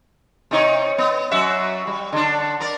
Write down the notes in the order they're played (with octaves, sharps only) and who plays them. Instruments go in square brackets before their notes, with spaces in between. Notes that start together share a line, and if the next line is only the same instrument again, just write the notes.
[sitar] C3 D#4 C#5
B3
F#2 F#4 E5
G3
D3 D4
A#4 D5